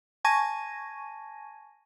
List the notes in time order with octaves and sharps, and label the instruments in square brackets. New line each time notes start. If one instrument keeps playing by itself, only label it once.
[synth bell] G#5 A5 C#6 G#6 A#6 D#7